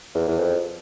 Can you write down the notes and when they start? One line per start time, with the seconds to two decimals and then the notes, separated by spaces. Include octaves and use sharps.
0.15 E2
0.28 E2
0.39 F2